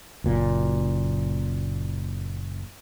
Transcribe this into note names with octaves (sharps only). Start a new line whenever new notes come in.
F#1 A#2